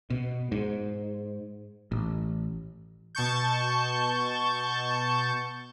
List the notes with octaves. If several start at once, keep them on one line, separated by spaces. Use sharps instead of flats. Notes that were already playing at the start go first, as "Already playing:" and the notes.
B2
G#2
A1
B2 A5 C#6 G6